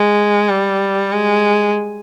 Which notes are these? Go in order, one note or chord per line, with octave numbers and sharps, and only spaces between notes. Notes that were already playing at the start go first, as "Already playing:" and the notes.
Already playing: G#3
G3
G#3